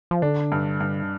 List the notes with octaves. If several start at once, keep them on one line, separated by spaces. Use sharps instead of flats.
F3
D3 D4
G2
G2